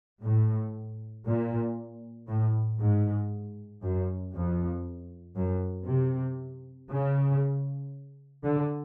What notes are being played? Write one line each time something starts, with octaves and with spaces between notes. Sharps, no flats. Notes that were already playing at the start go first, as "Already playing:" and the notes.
A2
A#2
A2
G#2
F#2
F2
F#2
C3
C#3
D3